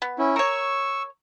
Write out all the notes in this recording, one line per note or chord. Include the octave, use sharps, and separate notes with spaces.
B3
C#4 E4
A#4 C#5 C#6 E6